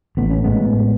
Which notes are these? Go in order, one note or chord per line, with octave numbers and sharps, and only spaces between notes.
A1 B3
C#4
A2 G#3 B3